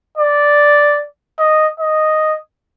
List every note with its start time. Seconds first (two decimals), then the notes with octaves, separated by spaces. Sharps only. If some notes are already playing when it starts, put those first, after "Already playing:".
0.18 D5
1.39 D#5
1.80 D#5